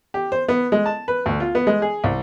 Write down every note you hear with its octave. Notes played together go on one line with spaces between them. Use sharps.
G4
C5
B3
G#3
A5
B4
D2
F4
B3
G#3
G#4
C2